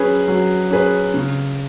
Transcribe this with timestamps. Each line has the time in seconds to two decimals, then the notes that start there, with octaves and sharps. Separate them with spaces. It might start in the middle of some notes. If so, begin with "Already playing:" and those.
Already playing: F#3 C#4 G#4 B4
0.28 F#3
0.71 C#4 G#4 B4
1.14 C#3